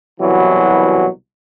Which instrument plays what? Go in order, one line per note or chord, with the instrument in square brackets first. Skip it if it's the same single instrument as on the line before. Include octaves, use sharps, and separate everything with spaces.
[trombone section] C2 B2 E3 F#3